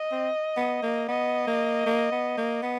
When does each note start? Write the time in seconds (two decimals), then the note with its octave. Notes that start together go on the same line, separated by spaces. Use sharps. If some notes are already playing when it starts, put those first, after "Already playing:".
Already playing: D#5
0.12 C4
0.57 B3
0.83 A#3
1.08 B3 D#5
1.47 A#3
1.86 A#3
2.12 B3
2.38 A#3
2.63 B3